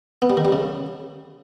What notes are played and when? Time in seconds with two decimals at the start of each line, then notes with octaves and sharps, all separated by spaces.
0.22 B3
0.30 G3
0.37 D#3
0.45 G3
0.52 C#3